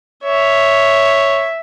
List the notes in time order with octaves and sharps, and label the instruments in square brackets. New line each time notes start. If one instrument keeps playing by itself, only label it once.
[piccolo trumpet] C#5 [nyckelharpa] E5